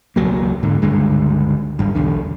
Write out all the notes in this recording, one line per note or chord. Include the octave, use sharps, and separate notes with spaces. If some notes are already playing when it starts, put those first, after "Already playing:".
E1 C#2 F#3 A#3
G#2 D3
C#2 G2 D3 G#3
G#1 G2
B1 E2 D3